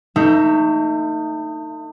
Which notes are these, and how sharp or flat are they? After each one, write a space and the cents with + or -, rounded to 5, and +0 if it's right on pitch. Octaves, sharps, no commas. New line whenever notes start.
A3 +40 D#4 +0 E5 +20